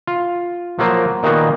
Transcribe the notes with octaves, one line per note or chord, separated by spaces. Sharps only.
F4
F3 F#3 A#3 F4 C5
A#2 D#3 A#3 B3 F#4